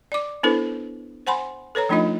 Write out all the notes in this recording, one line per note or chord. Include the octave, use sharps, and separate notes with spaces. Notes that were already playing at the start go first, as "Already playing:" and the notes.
D5 D6
B3 D4 E4 A4 B4 C5
C5 F#5 G#5 B5 C6
A4 B4 C#5 A#5
F3 A3 D4 D#4 F4 D#5